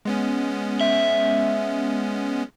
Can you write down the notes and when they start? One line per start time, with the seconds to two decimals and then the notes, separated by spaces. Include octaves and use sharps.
0.05 G#3 B3 C#4
0.81 E5